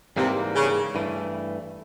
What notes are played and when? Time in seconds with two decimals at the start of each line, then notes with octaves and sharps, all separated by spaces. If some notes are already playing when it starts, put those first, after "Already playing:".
0.17 G#2 C3 E3 G3 A#3
0.55 C#3
0.95 G2 E3 A3